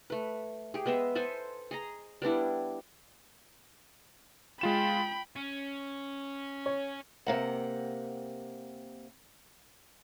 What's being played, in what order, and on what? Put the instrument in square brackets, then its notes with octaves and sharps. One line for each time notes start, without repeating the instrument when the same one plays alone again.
[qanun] A3 B4
G4 G#4
G#3 B3 D#5 E5
A4 B4 C5 G#5
G#4 D#5 A#5
G3 B3 D4 E4
[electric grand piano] G#3 F4 E7 [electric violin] G5 B5
[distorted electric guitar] C#4
[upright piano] C#5
[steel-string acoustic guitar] C3 A#3 F#5